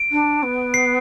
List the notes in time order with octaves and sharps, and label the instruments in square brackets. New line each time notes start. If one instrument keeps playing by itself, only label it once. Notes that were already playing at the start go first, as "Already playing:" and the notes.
Already playing: [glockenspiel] D7
[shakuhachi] D4
B3
[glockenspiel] C7